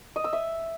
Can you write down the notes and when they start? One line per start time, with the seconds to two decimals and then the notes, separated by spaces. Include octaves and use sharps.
0.16 D#5
0.24 E6
0.33 E5